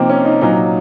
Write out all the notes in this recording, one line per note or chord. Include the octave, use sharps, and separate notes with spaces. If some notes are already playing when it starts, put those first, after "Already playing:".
Already playing: C3 F3 A#3 C4 D#4
C#4
D#4
A#2 F#3 D#4